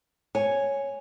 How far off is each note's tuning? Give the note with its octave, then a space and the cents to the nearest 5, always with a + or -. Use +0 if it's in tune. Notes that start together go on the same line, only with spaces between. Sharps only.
C#5 +0 G#5 +0